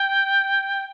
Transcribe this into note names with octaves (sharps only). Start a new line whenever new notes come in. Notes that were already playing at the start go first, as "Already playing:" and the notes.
Already playing: G5